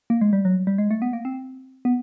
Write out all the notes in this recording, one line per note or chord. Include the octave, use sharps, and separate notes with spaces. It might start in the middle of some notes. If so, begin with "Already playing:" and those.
A#3
G#3
G3
F#3
G3
G#3
A3
B3
A#3
C4
B3